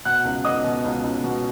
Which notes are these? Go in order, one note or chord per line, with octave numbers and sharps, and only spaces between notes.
B2 F#5 F#6
C#2
B2 D#5 D#6
B2
C#2
C#2
B2